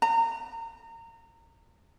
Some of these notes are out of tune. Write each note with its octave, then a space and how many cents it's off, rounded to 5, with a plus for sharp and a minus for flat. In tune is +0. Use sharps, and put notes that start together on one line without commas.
A#5 -25